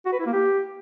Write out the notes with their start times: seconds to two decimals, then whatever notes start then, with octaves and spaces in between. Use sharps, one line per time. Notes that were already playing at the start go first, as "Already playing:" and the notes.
0.06 F#4
0.13 B4
0.19 E4
0.26 A#3
0.33 G4